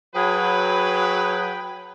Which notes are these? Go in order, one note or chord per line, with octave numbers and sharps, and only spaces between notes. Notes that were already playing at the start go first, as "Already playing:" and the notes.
F#3 G#4 B4 G5 B5